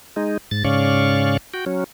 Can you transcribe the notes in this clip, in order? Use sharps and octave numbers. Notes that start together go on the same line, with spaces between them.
G#3 D#4
G#2 A6
G#2 C#3 C#4 D5 F5 C#6
F#4 G5
F#3 C#4